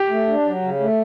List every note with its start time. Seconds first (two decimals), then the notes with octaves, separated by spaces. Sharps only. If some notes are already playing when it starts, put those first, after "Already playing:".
Already playing: G4
0.10 A3
0.27 D4
0.45 F#3
0.62 C#3
0.80 A3